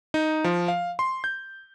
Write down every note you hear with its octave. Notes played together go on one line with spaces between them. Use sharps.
D#4
F3
F5
C6
G6